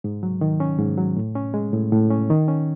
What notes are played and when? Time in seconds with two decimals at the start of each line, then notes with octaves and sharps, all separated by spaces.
0.04 G#2
0.23 F#3
0.41 D#3
0.60 C#4
0.79 G#2
0.97 F#3
1.17 A2
1.36 C#4
1.54 G#3
1.73 A2
1.92 A2
2.11 C#4
2.30 D#3
2.48 C#4